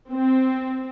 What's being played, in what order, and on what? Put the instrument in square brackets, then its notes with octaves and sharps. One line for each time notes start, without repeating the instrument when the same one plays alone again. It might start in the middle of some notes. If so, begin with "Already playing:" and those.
[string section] C4